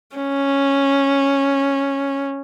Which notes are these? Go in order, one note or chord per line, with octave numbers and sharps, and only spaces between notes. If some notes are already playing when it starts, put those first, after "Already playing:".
C#4